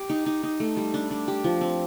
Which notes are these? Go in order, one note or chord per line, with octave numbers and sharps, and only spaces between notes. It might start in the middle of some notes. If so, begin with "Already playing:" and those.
Already playing: G4
D#4
D#4
D#4
A3
G3
D4
D4
G4
F3
C4